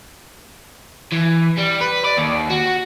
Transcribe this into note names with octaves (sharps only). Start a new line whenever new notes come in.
E3
G3
B4
D5
D#2
F#4